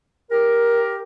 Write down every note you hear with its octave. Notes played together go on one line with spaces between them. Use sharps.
G4 A#4